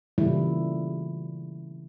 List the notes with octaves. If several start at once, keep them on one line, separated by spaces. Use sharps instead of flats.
A#2 C#3 E3 G3 A3 E4